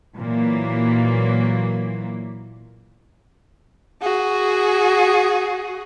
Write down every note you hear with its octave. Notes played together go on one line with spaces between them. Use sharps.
A#2 E3 F#3 A#3
F#4 G#4